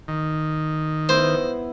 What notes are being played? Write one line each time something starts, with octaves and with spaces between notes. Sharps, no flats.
D#3
B3 E4 C5